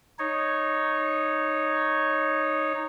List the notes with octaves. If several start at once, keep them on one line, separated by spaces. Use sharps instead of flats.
D#4 C#5